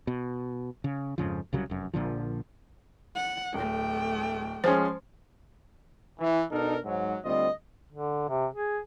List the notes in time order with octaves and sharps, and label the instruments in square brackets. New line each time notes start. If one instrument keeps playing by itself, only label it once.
[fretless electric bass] B2
C#3
F2 G#2 C#3 F3
C2 C#3 F#3 G3
F1 F#2
A#1 A#2 D3 F3
[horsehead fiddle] F#5
[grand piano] D1 [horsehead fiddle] A3 G5
[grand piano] F3 G#3 C#4 [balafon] C5
[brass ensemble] E3
B2 D4 D#4 A4 A#4
G#2 F#3
D2 G3 C4 F4 D#5
[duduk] D3
C3
G#4